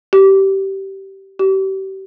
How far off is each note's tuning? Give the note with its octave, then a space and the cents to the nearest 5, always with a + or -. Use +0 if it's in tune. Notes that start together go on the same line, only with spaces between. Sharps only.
G4 -20
G4 -35